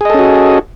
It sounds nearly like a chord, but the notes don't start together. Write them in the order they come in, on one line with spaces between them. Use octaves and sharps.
G#4 D#5 A4 C#4 F#4